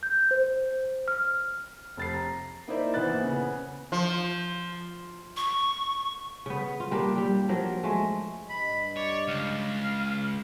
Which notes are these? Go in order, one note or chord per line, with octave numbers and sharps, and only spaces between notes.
G6
C5
F6
F1 A6 C7
A#5
A#3 D#4 E4 C5 D5 E5
A#2 E3 B3 C5 F#6 A6
C#3 B3
F3
C#6
C#3 B3
F4
G3 A#3 D4
G3
F3 F#3 A#3
G#3 A3
G2 D#5 B5
C#5 D5
C#2 F5